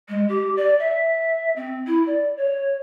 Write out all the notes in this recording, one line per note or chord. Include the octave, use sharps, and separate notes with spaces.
G#3
G4
D5
E5
C4
E4
D5
C#5